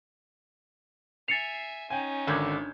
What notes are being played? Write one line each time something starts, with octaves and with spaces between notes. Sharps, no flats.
E5 G#5 A6 C7 C#7 F7
C#4 D#4 G5 G#5
G#1 D3 G6 G#6